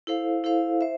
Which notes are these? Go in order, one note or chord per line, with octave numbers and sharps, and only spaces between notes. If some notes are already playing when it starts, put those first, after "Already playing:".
E4 A4 C5 F5
E4 A4 C5 F5
C5 E5